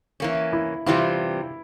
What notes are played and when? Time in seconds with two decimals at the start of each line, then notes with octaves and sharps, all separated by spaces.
0.20 E3 A#3 C#4
0.53 E4
0.86 C3 E3 G3 C4 E4 F4